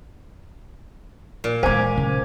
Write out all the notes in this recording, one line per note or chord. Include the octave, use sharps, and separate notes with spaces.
A#2
E3 G#3 C5 G#5 D6
C#3